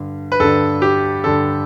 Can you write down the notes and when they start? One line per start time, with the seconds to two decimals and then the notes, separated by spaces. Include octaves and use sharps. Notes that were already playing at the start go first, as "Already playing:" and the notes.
Already playing: G2 D3
0.32 B4
0.40 G2 D3 A4
0.82 G4
1.24 G2 D3 A4